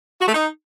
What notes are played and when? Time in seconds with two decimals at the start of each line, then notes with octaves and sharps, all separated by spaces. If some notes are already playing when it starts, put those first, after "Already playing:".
0.21 F#4
0.27 A3
0.33 D#4